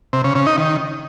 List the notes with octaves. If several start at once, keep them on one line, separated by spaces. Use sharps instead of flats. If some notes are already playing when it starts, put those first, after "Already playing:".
C3
C#3
C#3
D#4
D#3